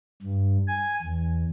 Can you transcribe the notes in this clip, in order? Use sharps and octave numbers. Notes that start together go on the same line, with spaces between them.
G2
G#5
E2